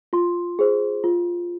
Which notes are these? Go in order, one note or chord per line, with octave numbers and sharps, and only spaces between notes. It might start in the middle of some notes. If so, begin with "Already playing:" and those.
F4 C6
G#4 C5
F4